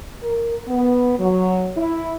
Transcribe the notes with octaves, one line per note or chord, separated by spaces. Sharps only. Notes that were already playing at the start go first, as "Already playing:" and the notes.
A#4
B3
F#3
E4